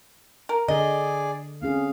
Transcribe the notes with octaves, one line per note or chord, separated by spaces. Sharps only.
A#4
D3 D4 G#4 A4 D5 D#5
C4 C#4 G#4 F5